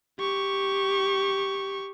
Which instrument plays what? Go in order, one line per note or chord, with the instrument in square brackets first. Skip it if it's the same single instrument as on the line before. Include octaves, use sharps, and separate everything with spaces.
[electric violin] G4 C#6